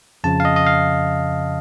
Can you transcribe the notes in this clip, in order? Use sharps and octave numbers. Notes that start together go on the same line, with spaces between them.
F2 C#3 F3 A5
F5
D#5
D#5
F5